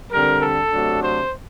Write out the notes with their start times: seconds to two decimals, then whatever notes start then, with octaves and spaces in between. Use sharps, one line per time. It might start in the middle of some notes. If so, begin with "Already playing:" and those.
0.11 D3 G3 C4 A#4
0.41 A4
0.71 C3 F#3 A3 D4
1.01 C5